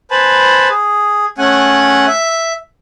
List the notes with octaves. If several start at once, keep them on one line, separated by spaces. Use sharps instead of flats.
B4 C5 G#5 A5 B5
G#4
A3 C#4 F#5 G#5
E5